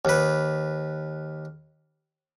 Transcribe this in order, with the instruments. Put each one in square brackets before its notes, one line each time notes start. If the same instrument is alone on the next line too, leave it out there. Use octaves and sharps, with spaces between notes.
[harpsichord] D#2 B4